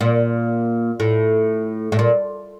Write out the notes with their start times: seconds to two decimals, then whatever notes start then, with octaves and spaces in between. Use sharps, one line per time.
0.01 A#2
1.00 A2
1.92 A2
1.99 A#2